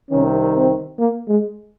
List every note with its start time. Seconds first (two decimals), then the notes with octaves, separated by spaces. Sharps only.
0.11 C2 C3 D#3 C#4
0.55 C4
0.99 A#3
1.28 G#3